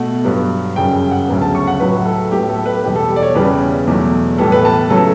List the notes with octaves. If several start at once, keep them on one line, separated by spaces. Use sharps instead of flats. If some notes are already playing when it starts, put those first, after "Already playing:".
Already playing: B2 A3 F#5
G2 F#3 B3
F#2 C#3 G3 G5
F#5
D2 C#3 F#3 B3
A5
C#6
F#5
A2 F#3 A3 B4
A4
A2 F#3 B3 G4
A4
B4
E2 B2 G3 B3 G4
A4
G4
D5
C#5
E2 C#3 E3 G3 B3 B4
E2 B2 F#3 A3
A2 E3 G3 B3 A4
B4
A5
C#3 F#3 A3 A4